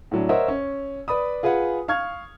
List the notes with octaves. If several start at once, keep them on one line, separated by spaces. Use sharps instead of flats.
A2 F#3 D4
A#4 C5 C#5 D#5 E5 F#5
C#4
B4 D5 B5 D#6
F4 G#4 B4 F5 F#5 G#5
F5 C#6 F6 G#6